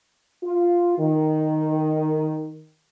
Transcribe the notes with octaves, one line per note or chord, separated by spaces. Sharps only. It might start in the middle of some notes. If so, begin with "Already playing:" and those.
F4
D#3